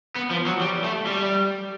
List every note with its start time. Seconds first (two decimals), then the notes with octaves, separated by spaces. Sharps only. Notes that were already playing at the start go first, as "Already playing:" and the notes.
0.16 B3
0.31 F3
0.46 F#3
0.61 G3
0.84 A3
1.06 G3